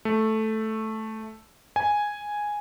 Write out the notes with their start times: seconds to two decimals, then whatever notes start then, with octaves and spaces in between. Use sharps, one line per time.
0.05 A3
1.76 G#5